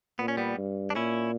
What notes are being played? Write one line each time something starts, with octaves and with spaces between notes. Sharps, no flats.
A#2 B3
C#4
G3 B3
G2
D4
A#2 C#4 E4